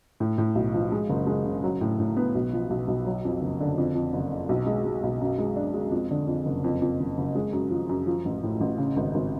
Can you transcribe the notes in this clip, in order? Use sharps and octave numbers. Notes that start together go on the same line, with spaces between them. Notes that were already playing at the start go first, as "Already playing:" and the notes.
A2
A2
B1
F3
G#3
F#1
G#3
C#3
F#3
A2
A2
B3
B1
F3
B1
B1
F#3
F2
F#1
D3
F2
F2
F#1
C#3
B1
G#3
G#3
B1
F#2
G#3
D4
G#3
F2
D3
F2
F#1
F2
F2
F#1
F#1
G#3
F#2
F3
F#2
F3
A1
A2
A1
C#3
G#1
G#1